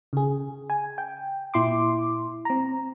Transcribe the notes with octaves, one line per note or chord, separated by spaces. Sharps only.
C#3 G#4
G#5
G5
A#2 E4 C6 D6
C4 A#5